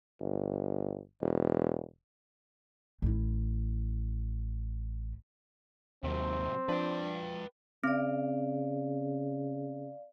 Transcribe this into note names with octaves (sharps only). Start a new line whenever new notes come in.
G1
E1
A1 E4
D#2 C3 F#3 C4
F3 D4 B4 G5
C#3 C4 D5 F5